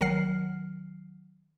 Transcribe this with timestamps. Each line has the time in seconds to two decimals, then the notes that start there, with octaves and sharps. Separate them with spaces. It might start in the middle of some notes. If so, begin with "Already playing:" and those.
0.01 G#1 D#3 F#3 F#5 F6 C7